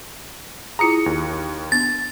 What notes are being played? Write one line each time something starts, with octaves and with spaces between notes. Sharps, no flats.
E4 F4 G#4 A#5 D#6 C#7
D#2
B3 D4 A6